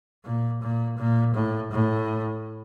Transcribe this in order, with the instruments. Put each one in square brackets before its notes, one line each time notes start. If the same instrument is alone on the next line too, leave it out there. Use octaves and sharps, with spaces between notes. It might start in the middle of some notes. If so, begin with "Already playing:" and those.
[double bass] A#2
A#2
A#2
A2
A2